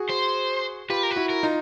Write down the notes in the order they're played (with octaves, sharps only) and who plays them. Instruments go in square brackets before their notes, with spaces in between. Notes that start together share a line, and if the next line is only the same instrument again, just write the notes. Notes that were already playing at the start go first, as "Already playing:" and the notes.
Already playing: [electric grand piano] F#4 G#4
[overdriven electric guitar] C5
[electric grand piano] F4 G4 [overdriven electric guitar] B4
[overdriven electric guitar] A#4
B4
[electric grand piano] E4 F#4
[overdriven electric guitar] A#4
[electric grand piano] D#4 F4